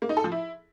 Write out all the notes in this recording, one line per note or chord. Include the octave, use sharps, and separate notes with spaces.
A#3
D#4
A4
F3
E4